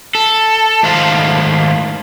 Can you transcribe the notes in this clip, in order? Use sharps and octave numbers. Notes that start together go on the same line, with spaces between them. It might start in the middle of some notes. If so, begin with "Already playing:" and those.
A4
G#2 D#3 A3 C5 F5